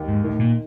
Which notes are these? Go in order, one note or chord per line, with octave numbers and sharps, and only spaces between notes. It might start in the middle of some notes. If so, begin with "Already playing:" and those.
Already playing: D#2
G#2
A2 D#3
A#2